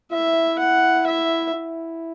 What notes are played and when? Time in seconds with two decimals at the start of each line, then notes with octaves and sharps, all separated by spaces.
0.12 E4 E5
0.59 F#5
1.07 E5
1.54 E4